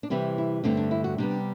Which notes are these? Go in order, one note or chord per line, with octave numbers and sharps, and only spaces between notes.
D4
C3 E3 G3 C4 E4
E4
G2 D3 A3 C4 D4
D4
E4
F#4
C3 G3 B3 D4